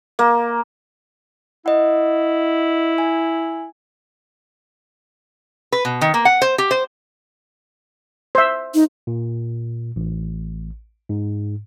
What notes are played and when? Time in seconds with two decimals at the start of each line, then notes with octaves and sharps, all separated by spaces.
0.19 A#3
1.66 E4 D#5 F#5
2.98 G#5
5.72 B4
5.85 B2
6.01 D#3
6.14 A#3
6.25 F#5
6.42 C5
6.58 G4
6.71 C5
8.35 C5 E5
8.74 D#4
9.07 A#2
9.96 A1
11.09 G#2